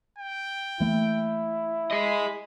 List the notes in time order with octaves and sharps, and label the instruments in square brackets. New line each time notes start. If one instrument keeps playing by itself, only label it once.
[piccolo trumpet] G5
[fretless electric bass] E3 A3 A#3 [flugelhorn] E4
[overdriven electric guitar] G#4 D#5 [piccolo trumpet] B5